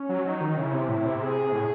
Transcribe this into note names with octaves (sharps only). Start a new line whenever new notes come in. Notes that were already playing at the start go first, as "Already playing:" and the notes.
Already playing: C#4
F#3
F#3 D#4
D#3
C#3 E4
C3
A2 E4
C3
G#4
A2